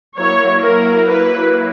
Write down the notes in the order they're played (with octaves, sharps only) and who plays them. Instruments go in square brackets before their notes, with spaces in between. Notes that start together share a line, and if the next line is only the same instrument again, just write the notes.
[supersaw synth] F#3 A#3 E4 [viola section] C#5
[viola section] A#4
B4